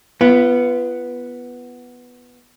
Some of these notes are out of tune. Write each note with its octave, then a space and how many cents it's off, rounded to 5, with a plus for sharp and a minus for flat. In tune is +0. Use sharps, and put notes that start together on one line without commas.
B3 +0 F4 -35